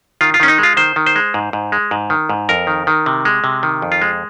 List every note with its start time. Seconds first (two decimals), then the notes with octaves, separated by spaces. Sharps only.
0.21 D#3 F4
0.34 F4
0.40 D#3 C#4
0.48 D#4
0.58 G#3 F4
0.77 D#3 C5
0.96 D#3
1.06 C5
1.16 G#3
1.34 G#2
1.53 G#2
1.72 G#3
1.91 G#2
2.10 D#3
2.29 G#2
2.49 F2 A#4
2.67 D#3
2.87 D#3
3.06 C3
3.25 G#3
3.44 C3
3.63 D#3
3.82 F2
3.92 F4
4.02 G#3